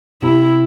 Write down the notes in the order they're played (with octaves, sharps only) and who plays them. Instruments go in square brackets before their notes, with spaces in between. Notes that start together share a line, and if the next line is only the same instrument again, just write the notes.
[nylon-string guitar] C3 [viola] E4